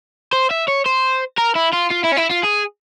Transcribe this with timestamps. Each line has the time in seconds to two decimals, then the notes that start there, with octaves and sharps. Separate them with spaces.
0.33 C5
0.50 E5
0.68 C#5
0.86 C5
1.38 A#4
1.56 E4
1.73 F4
1.91 F4
2.05 E4
2.13 C#4
2.18 E4
2.31 F4
2.44 G#4